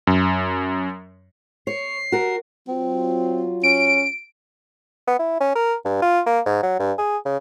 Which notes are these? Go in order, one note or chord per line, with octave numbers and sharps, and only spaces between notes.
F#2
C#5 C7
F#4 A#4
F#3 C4 F4
C#4 D7
B3
E4
C#4
A#4
G2
F4
A#3
G#2
F#3
G2
G#4
C#3